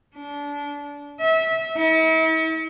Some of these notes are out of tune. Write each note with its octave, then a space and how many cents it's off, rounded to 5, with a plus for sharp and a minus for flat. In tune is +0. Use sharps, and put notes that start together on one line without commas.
D4 -25
E5 -25
E4 -45